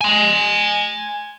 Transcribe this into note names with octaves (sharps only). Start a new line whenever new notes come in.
G#5 C6